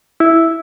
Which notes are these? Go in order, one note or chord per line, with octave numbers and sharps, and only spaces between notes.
E4